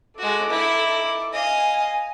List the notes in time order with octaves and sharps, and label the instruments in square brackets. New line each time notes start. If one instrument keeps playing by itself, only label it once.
[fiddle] G#3 F#4 [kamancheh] A4 D6
[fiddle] D#4 E4
[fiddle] D#5 F5 [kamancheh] G#5